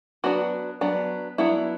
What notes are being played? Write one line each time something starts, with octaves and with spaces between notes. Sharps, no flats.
F#3 B3 D4 F#4
F#3 B3 D4
F#3 B3 D4 E4